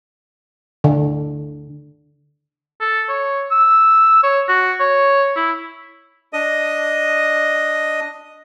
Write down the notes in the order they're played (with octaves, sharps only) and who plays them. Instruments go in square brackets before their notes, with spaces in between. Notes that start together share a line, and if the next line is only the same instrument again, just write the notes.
[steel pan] D3
[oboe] A4
C#5
E6
C#5
F#4
C#5
E4
[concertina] D4 D#5 D#6